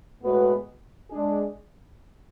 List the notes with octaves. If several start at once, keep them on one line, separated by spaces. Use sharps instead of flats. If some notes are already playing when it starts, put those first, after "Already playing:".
A2 G#3 B3 F#4 B4
G#3 D4 G#4